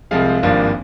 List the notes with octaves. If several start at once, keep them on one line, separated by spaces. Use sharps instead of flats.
C2 C3 F3 G#3 C4 F5
G#1 G2 F3 A#3 D4